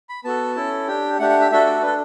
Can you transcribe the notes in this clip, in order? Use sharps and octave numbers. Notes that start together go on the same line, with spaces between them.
B5
B3 F#4 A4 A5
C#4 E4 A4
D4 G4 G5
A3 D4 G4 F#5
F#5
E5
A3 D4 F#4 A4 E5
D5
D4 A4 B4